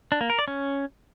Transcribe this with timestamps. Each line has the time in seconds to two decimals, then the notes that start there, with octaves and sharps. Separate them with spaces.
0.12 D4
0.21 A#3
0.30 A#4
0.39 D5
0.48 C#4